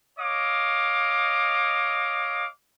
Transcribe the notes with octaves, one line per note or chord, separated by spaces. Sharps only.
C#5 D#5 F5 D6